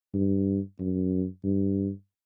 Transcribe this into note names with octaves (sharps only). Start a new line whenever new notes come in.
G2
F#2
G2